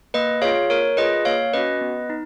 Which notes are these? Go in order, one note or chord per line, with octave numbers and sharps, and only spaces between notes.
A#3 B4 D#5
F4 G#4 C#5 F5
A#3 A#4 C#5
F4 G#4 B4 D#5
A#3 C#5 F5
C#4 F#4 B4 D#5
B3
D#4